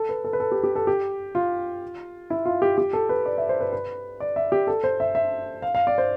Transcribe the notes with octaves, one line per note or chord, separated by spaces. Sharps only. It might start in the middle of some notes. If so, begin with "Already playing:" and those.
Already playing: A4
B4
A4
B4
A4
G4
G4
A4
G4
F4
E4
F4
G4
G4
A4
B4
D5
E5
C5
B4
B4
D5
E5
G4
A4
C5
E5
E5
F5
F5
D5
C5